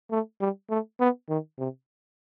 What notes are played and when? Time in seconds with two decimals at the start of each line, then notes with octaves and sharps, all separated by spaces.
0.11 A3
0.41 G3
0.70 A3
1.00 B3
1.29 D#3
1.59 C3